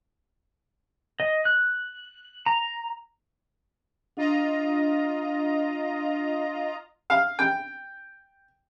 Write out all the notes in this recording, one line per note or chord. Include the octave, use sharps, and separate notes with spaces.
D#5
F#6
A#5
D4 F4 D#5 A#5
F5
G5